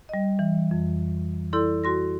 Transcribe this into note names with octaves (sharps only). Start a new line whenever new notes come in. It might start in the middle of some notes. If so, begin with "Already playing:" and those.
G3 D#5
E3
F2
E4 A4 D5 C6 G6
F#4 C6 A#6